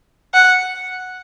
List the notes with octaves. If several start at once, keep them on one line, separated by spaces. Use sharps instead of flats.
F#5